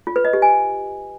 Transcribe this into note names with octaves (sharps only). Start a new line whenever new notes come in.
F4
B4
D#5
G4
G#5